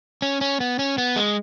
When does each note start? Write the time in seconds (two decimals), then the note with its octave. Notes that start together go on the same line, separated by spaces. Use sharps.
0.22 C#4
0.41 C#4
0.60 B3
0.79 C#4
0.98 B3
1.16 G#3